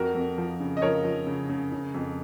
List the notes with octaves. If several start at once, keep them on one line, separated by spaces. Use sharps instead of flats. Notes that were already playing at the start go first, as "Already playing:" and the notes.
Already playing: F2 F#4 A#4
F2
F3
C#3
D#5
F3 A#4 C#5
F3
C#3
C#3
C#3
F2